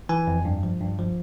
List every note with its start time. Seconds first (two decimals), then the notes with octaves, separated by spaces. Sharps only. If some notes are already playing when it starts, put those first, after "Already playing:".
0.09 E3 G#5
0.27 F2
0.45 G2
0.63 F3
0.81 G2
0.99 F3